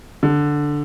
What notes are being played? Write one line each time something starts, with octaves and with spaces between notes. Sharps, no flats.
D3